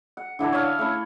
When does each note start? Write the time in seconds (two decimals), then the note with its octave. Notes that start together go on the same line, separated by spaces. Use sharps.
0.17 F#5
0.39 D3 E3 D4 A4
0.53 C#5 E5 F5
0.79 A3 C#4 E4 G#5